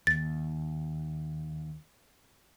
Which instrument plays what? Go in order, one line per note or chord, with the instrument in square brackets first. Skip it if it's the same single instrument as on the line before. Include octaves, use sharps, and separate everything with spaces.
[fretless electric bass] D#2 [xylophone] A6